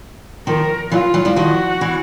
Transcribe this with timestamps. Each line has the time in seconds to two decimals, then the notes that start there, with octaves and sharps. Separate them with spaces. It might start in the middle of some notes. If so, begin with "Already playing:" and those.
0.47 D#3 F3 A#4
0.91 E3 F#3 F4
1.14 E3 F#3
1.25 F3 G3
1.36 D#3 F3 F#4
1.81 E3